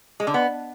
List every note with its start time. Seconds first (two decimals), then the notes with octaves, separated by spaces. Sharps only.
0.20 G#3
0.27 D3
0.34 B3